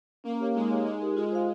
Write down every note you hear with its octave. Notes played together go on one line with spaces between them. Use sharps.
A#3 C#4
G4 C#5 F5
G#3 D#4
G4 C#5 F5
G#3 D#4
G4 A#4
G#3 F4
C5 F5